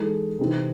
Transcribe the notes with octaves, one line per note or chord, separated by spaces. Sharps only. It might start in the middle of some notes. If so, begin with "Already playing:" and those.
Already playing: E3 G#3 D#4 A4
C3 E3 C4 D#4